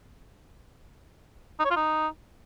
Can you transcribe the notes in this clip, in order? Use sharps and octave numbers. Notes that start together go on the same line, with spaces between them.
D#4
C#5
F4
D#4